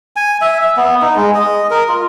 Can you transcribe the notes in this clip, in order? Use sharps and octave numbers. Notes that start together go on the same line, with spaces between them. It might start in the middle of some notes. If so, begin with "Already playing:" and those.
G#5
E5
E5
B3
D#4
G#3
D#5
A#4
F4